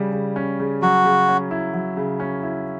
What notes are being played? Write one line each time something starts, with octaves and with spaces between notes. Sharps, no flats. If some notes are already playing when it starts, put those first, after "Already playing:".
Already playing: C#3 G3 C#4
C#3
C#4
C#3
F#3 F#4
C#3
C#4
E4
F#3
C#3
C#4
E4